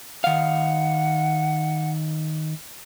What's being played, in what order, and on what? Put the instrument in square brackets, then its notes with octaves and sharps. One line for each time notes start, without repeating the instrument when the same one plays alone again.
[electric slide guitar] D#3 F5 [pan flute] F#5